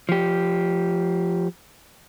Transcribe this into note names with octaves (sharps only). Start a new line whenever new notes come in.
F3 G4